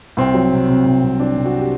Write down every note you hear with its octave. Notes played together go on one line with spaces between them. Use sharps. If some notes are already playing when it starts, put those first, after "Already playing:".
C2 C4
F#3
C3
C3
C2
C2
C2 D4
C2
F#4
G4